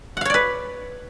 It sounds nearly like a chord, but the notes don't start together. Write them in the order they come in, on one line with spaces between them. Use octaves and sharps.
F#5 F5 C#5 D5 B4